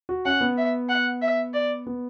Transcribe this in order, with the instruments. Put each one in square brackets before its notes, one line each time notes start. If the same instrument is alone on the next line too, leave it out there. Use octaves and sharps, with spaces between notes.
[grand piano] F#4
[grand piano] C#4 [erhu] F#5
[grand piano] B3
[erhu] E5
F#5
E5
D5
[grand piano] B3